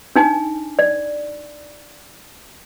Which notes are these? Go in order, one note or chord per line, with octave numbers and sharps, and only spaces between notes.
D4 D#4 G#5
D5